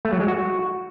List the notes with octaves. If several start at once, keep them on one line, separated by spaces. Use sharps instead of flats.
A3
F#3
G#3
F#4